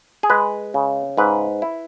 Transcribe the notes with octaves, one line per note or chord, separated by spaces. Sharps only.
G#4
G#3 B4
C#3
G#2 B4
E4